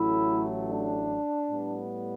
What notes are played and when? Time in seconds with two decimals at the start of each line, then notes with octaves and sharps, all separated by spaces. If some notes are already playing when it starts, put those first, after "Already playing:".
Already playing: A1 A2 F#3 A3 E4
0.68 D4
1.51 A2 G3 B3